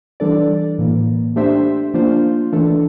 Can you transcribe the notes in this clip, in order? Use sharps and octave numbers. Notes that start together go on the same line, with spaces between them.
E3 G3 D4 A4 D5
A2 E3 A#3
A3 D4 G4 C5 E5
F3 A#3 D4 F4 C5
E3 A3 D4 A4